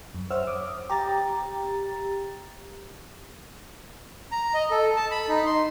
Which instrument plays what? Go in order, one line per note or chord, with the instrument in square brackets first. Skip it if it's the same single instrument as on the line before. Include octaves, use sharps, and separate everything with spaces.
[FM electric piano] F#2
C5 C#5 E5 F#5 E6 F6
D6 D#6
G4 A#5 A6
[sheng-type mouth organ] A#5
D#5
A4
A5
B5
D#4
C6